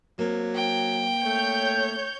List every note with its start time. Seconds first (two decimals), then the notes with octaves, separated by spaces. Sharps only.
0.19 F#3 A#3 C4
0.55 G5
1.25 A3 C#5 G6